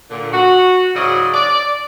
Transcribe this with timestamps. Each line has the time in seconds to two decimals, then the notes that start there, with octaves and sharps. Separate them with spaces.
0.10 A#2 D3
0.33 F#4
0.95 G#2 C#3 F#3 E4 D5 D#5
1.34 D5